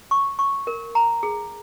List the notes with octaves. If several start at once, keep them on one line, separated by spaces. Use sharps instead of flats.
C#6
C#6
A#4
A#5
G#4